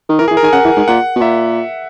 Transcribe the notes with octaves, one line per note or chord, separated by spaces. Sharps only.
D#3
E3 A#4
G#4
E3
A#4
D#3 G#5
C#3 F#5
E3
G#2
A#2 F#5
B2
A#2 E5